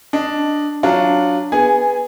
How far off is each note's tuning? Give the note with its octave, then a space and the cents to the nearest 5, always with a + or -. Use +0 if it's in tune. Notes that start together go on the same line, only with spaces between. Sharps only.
D4 +0 D#5 +0
F#3 +0 D4 +0 F4 +0
B3 +0 G#4 -15 G#5 +0